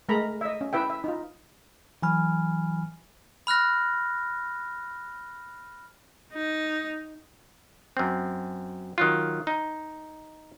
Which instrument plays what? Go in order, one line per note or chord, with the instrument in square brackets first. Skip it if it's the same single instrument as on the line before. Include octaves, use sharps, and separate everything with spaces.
[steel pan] G#3 A3 A#4 A#5 B5
D#5 E5
C#4
E4 B4 E5 G5
E5
D#4 F4
[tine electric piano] E3 F#3 G#5 B5 F6
[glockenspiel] B5 F6 F#6 A#6
[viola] D#4
[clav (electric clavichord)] F#2 C4
D#3 F#3 F4
D#4